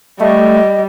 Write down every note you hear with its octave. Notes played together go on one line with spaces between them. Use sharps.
G3 A3 D#5